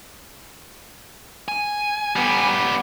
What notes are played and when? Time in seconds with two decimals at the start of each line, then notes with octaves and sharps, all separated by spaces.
1.48 G#5
2.16 G3 B3